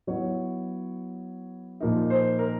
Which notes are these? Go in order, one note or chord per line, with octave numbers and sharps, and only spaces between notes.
F#3 B3 E4 C#5
A#2 F3 A#3 D#4
C5
A#4